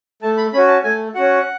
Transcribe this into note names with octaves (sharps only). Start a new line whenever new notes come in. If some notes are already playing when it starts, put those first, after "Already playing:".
A3 A5
B5
C#4 F#4 B5
A5
A3 G#5
C#4 F#4 F#5